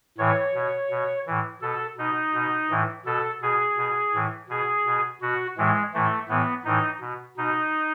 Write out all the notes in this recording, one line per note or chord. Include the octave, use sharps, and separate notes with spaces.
A2 E3 C#5
B2
B2
A2 E3
B2 A4
B2 D#4
B2
A2 E3
B2 A4
B2 G#4
B2
A2 E3
B2 G#4
B2
B2 F#4
A2 E3 G#3
A2 E3 A3
A2 E3 B3
A2 E3 D#4
B2
B2 D#4